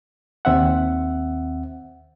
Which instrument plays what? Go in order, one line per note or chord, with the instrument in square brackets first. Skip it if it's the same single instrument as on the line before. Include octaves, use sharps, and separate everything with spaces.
[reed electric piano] D#2 C4 E5 F#5